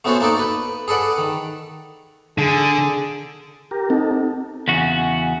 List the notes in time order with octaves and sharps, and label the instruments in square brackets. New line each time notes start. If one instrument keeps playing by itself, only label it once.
[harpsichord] A3 B3 C#4 F#4 A4 C5
A#3 D#4 A4 D5
B4
G#4 A4 B4 D5 F#5
D#3
[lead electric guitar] D3 [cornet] G#4
[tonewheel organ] G4 A#4
[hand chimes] C4 [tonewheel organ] D#4 A4
[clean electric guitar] E2 C#3 F#4